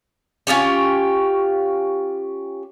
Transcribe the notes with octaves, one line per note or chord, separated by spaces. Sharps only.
C#4 F4 G4 C#5